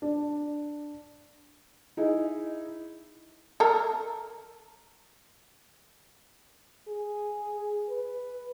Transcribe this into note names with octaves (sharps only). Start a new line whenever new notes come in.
D4
D#4 E4 G#4
A4 A#4
G#4
B4